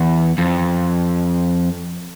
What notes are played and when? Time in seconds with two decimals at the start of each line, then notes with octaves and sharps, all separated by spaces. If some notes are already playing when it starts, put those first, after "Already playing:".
Already playing: E2
0.38 F2